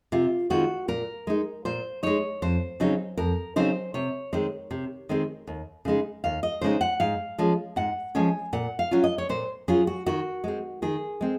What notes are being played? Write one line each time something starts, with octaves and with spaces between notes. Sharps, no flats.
C3 F4
D#3 G#3 C4 F4 F#4
A#2 A#4
G#3 D#4
A#2 C5
G#3 D#4 C#5
F2 C5
C#3 F#3 C4 D#4
F2 A#4
C#3 F#3 C4 D#4 C5
C3 C#5
D#3 G#3 C4
C3
D#3 G#3 C4
D#2
C#3 G#3 D#4
D#2 F5
D#5
C#3 G#3 D#4 C5
F#5
G#2 F5
F3 G#3 C#4
G#2 F#5
F3 G#3 C#4 G#5
A#2 F#5
F5
F#3 C#4 F4
D#5
C#5
A#2 C5
F#3 C#4 F4 G#4
F#4
D#3 F#4
G#3 C4
D#3 G#4
G#3 C4